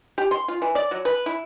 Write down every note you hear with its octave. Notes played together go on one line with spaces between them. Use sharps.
G4
C6
F4
E3
D5
F#3
B4
E4